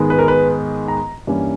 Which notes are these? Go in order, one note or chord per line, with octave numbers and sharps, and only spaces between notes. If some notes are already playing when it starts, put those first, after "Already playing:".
Already playing: G#2 D#3 G#3 B3
B4
A#4
B4
A#5
G2 E3 A#3 C#4